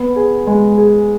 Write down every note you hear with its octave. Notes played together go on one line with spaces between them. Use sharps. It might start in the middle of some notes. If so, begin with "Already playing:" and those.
Already playing: B3
G#4
G#3
G#4